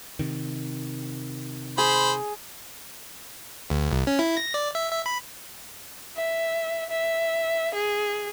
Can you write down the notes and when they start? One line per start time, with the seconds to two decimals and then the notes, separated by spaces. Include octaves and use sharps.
0.19 C3 D#3
1.78 G#4 C5 B5
3.70 D2
3.91 C2
4.07 C#4
4.19 E4
4.37 A#6
4.54 D5
4.75 E5
4.92 E5
5.06 B5
6.17 E5
6.90 E5
7.75 G#4